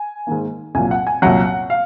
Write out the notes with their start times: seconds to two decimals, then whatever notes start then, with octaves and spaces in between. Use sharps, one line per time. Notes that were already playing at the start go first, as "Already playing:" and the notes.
Already playing: G#5
0.27 G#2 D#3 A#3
0.75 C2 A#2 F#3 G#5
0.91 F#5
1.07 G#5
1.22 C2 A#2 F#3 F#5
1.70 F5